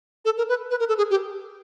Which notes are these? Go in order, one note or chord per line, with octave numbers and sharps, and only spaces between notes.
A4
A#4
B4
B4
A#4
A4
G#4
G4